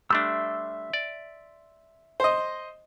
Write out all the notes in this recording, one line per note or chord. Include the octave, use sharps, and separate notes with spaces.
G3 A3 D4 E5 C6 E6
D5
C5 D#5